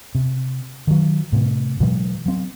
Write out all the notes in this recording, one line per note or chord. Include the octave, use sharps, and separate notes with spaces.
C3
D#3 F#3
A2 C3
B2 E3 F#3 G#3
F#3 C4